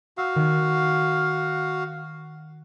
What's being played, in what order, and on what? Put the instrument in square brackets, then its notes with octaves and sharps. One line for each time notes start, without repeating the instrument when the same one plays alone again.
[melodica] F#4 F5 [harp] E6
[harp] D#3